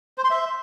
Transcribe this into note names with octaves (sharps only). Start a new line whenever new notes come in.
C5
C6
E5